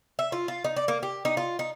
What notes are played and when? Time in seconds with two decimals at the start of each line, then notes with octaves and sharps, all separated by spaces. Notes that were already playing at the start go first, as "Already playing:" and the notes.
0.19 E5
0.32 F4
0.48 F4
0.65 D#4
0.76 D5
0.88 A#3
1.03 G4
1.25 D#4
1.37 F4
1.59 D#4